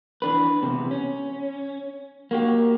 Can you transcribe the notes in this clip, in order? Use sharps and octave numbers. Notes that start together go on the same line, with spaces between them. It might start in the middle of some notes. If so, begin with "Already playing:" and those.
E3 D4 B4
E2 C3
C#4
A#3 F#4 G4